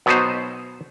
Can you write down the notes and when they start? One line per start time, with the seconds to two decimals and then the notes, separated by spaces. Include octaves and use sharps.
0.06 B2 F#3 B3 D#4 C5